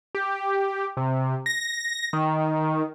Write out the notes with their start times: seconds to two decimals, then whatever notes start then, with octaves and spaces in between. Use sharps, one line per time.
0.15 G4
0.97 C3
1.46 A#6
2.13 D#3